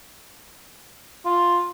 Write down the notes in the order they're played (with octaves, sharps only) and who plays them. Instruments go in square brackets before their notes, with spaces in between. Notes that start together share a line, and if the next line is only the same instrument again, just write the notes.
[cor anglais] F4